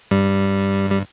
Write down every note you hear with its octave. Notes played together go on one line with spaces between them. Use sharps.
G2 G3
G3